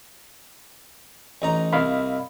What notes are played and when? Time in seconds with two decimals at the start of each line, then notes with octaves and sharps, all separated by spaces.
1.42 A1 D#4 A#5
1.73 C2 D#5 F5 B5